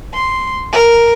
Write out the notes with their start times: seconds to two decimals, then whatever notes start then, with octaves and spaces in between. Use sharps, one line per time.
0.14 C6
0.72 A#4